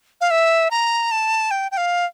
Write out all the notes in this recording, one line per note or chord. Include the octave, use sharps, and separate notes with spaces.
F5
E5
A#5
A5
G5
G5
F5